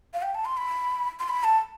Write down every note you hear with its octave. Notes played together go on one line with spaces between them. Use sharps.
F5
G5
A5
C6
B5
C6
B5
A5